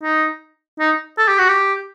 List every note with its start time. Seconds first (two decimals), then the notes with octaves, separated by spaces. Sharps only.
0.03 D#4
0.79 D#4
1.18 A4
1.28 G4
1.39 F#4
1.48 G4